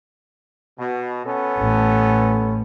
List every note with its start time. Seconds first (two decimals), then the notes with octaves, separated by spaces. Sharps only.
0.79 B2
1.26 B3 C#4 A4
1.57 A1